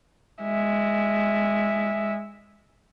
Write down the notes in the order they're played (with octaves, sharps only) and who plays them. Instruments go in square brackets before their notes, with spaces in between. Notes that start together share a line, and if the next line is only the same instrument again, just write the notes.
[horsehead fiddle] G#3 E5